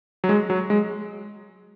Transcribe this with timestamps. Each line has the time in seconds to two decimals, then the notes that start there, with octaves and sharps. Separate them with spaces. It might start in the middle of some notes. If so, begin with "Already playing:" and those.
0.24 F#3
0.29 G#3
0.50 F#3
0.70 G#3